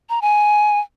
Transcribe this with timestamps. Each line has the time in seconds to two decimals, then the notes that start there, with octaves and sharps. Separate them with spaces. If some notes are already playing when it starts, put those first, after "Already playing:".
0.10 A#5
0.22 G#5